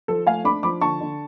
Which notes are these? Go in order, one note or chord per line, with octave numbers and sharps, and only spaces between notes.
F3 A4
A3 F5 G#5
D4 B5 D6
F3 B5 D6
D3 A5 C#6
D3